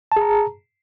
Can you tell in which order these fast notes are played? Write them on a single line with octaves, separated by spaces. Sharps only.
A5 G#4 A#5